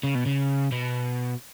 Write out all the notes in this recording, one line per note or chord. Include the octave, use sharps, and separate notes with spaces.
C#3
B2
C#3
B2